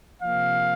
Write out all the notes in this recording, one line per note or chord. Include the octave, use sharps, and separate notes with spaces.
C3 F3 A#3 F5